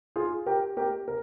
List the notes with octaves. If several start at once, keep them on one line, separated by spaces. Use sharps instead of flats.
F4 G#4
G4 A#4
G4 A#4
A#4